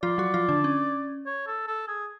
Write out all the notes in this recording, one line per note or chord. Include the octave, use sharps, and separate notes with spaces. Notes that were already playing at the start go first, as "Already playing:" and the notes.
F3 F4 D5
F#3 F#4
F3 F4
D3 D4
C#4
C#5
A4
A4
G#4